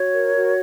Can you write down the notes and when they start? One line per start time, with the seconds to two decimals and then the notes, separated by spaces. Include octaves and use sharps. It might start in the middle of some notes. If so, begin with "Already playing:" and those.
Already playing: F#4 C#5
0.13 A#4
0.36 F#4